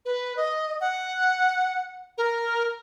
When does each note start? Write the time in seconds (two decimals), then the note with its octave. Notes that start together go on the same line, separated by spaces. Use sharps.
0.05 B4
0.37 D#5
0.81 F#5
2.18 A#4